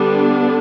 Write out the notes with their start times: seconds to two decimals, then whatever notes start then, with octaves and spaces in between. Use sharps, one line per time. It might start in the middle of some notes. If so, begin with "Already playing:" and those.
Already playing: D3 G3 B3 D4